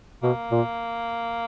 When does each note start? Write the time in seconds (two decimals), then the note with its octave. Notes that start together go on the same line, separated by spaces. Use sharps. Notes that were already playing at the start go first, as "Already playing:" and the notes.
0.22 B2 A#3
0.51 A#2